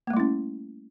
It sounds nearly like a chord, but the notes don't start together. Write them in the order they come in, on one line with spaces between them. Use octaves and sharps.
A#3 A3 G3 E4 C#4